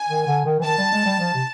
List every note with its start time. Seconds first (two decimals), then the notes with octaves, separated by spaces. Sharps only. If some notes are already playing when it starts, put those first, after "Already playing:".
Already playing: G#5
0.08 D#3
0.27 D3
0.45 D#3
0.60 E3
0.64 D#3 A5
0.78 G3
0.92 G#3
1.06 G3
1.19 F3
1.34 C3